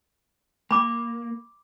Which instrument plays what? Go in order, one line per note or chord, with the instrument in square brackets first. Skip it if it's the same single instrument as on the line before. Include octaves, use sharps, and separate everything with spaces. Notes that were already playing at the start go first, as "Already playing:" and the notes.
[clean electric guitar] A#3 [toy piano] B5 D6